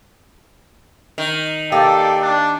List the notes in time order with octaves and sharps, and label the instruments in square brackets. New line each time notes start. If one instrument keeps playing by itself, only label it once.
[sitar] D#3
[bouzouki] A#3 [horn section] G4 D5 [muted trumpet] A4
[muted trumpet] D4